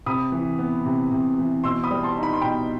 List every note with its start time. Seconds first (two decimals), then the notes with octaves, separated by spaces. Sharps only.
0.06 C3 B5 D#6
0.32 E3
0.59 B3
0.85 C3
1.11 C3
1.38 E3
1.64 B2 C6 E6
1.83 B5 D#6
1.91 G3
2.03 A5 C6
2.17 D#4
2.23 B5
2.33 C6
2.41 B2 G5 B5